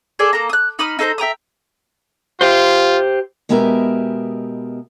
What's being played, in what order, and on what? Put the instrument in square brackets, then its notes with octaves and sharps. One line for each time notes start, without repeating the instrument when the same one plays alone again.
[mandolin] G#4 A4 D5 G#5
A#3 A4 A#5
D#6 F#6
D#4 B5 D#6 F6
D#4 A4 C5 A#5
E5 G5 A#5 D#6
[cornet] F4 [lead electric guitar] G4 C5
[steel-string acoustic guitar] B2 G#3 B3 G4 A#4 E5